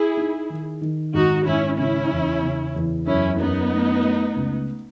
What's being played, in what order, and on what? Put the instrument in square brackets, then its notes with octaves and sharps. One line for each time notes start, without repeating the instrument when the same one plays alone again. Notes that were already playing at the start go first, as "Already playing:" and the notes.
Already playing: [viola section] E4 G#4
[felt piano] D#4
D#3
D#3
[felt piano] G#1 [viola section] D#4 F#4
[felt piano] G#1 [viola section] C#4 E4
[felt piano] C#3 [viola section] C#4 E4
[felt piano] E2
C#3
E2
[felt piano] F#2 [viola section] C#4 E4
[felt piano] F#2 [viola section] B3 D#4
[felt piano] A3
A3
C#2